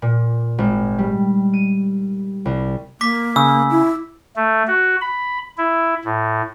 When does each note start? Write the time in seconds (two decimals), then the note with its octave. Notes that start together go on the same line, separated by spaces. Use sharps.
0.02 A#2
0.58 G#1
0.99 G3
1.53 D#7
2.45 C2
3.01 A#3 D6 B6
3.36 C#3 E6
3.70 E4
4.36 A3
4.68 F#4
5.01 B5
5.58 E4
6.05 A2